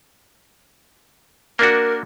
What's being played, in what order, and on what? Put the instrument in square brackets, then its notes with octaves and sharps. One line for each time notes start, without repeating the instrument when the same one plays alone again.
[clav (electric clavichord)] A#3 D4 F#4 [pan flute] A#4